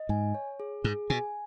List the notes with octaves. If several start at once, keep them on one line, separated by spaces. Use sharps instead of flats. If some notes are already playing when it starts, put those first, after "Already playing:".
Already playing: D#5
G#2 G#5
C#5
G#4
G#2 G#4
B2 G#5